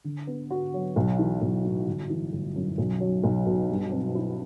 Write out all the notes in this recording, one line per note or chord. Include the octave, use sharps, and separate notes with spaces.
D3
B3
F#4
F#3
B1
E3
B1
A2
G1
E3
G1
F#2
B1
F#3
B1
B2
G2
C4
E4